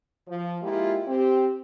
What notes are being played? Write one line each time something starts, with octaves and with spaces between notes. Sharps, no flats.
F3
G#3 A#3 E4 F4 G4
C4 G4